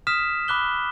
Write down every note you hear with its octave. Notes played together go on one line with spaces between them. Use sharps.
D#6 F6 B6 E7
B5 D6 F#6 G7